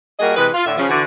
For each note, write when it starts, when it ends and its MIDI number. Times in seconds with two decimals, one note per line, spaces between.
0.20 0.35 55
0.20 0.35 58
0.20 0.35 66
0.20 0.35 68
0.20 0.35 70
0.20 0.35 75
0.37 0.50 48
0.37 0.50 52
0.37 0.50 56
0.37 0.50 71
0.54 0.63 65
0.66 0.74 45
0.66 0.74 50
0.66 0.74 76
0.78 0.89 49
0.78 0.89 53
0.89 1.03 50
0.89 1.03 52
0.89 1.03 66